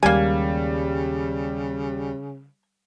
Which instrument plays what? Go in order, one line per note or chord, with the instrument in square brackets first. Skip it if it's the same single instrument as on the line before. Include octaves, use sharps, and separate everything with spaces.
[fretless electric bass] D#2 G#3 [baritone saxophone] C#3 [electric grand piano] G3 [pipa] A#3 G#5